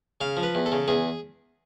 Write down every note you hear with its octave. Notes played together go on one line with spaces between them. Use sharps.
C#3 F5
F3
B4
E2
A4
C#3
E2 G#4